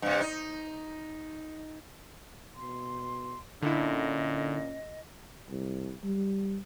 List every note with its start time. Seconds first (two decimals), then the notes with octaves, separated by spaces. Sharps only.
0.02 G2 C3
0.21 D#4
2.56 B2 C6
3.62 A#2 D3 C#4 E4 D#5
5.50 C2
6.04 G3